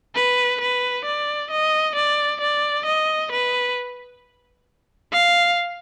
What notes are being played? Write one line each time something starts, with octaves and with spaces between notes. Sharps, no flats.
B4
B4
D5
D#5
D5
D5
D#5
B4
F5